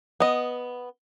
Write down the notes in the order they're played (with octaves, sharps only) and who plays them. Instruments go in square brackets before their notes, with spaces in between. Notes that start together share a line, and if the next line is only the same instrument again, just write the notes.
[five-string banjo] B3 D#5